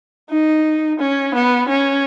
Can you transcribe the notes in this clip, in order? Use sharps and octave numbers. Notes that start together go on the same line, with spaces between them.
D#4
C#4
B3
C#4